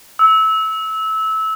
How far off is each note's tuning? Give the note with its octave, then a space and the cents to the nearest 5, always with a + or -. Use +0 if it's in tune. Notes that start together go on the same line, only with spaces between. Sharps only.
E6 -20